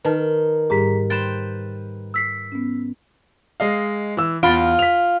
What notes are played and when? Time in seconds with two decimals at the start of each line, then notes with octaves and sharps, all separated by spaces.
0.05 D#3 B4 A5
0.70 G#2 G3 G4 G#4 A#5 B6
1.10 B4 C5 G5 A6 E7
2.14 E6 B6 C7
2.52 B3 C#4
3.60 G#3 D#5 F5
4.17 E3 E6
4.43 E2 F4 B5 D7
4.79 B6 F7